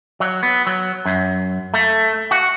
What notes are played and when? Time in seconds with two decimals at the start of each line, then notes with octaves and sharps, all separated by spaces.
0.20 F#3
0.43 B3
0.67 F#3
1.06 F#2
1.74 A3
2.31 F#4